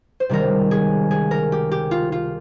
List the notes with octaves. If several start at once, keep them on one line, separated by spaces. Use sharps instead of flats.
C5
C#2 C3 D#3 G3 A#4
G#4
G#4
A#4
G4
G4
F4
F4